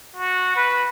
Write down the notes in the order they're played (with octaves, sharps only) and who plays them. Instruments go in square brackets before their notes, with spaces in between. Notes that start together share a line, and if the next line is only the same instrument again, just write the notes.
[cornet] F#4
B4